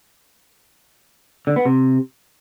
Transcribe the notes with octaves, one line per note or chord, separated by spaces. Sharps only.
D3
B3
C3